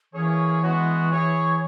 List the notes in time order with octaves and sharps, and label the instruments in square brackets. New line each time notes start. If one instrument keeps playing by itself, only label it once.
[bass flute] E3 [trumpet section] A#3 C#4 G#4 C#5
[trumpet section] G#3 B3 F#4
E4 G#4 C#5